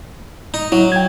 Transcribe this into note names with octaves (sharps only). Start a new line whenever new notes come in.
D#4
F#3 E4
G5 G#6